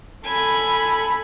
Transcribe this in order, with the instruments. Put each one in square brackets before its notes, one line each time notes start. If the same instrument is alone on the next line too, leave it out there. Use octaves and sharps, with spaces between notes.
[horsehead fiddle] A4 B5 [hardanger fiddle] G#5